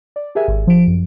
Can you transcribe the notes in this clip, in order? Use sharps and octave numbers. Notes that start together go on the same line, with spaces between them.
D5
G4 G#4 A#4 E5 G#5
G#1
F3 D7
F#2